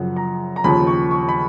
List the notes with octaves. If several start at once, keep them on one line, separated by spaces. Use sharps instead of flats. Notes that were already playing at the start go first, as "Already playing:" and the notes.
Already playing: F#2 C#3 F3 F#5
A#5
A#5
D#2 C#3 F3 B5
C#6
C#6
B5